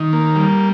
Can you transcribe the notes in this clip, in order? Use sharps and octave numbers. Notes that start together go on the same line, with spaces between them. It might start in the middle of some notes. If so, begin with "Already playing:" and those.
Already playing: D#3
A#3
G3